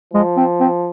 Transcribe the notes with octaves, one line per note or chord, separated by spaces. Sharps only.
F3 G#3
C4
C4